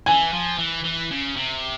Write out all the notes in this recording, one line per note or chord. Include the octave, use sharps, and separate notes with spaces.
E3 G#5
F3
E3
E3
C#3
C3